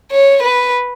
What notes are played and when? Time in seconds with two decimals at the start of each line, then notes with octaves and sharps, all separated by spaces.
0.11 C#5
0.43 B4